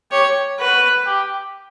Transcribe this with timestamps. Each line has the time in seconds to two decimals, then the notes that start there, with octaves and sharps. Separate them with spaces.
0.11 G4 C#5
0.59 F#4 B4
1.06 G4